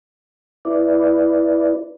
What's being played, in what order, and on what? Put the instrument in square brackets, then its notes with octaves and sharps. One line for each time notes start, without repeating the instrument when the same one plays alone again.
[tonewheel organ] E4 B4 D5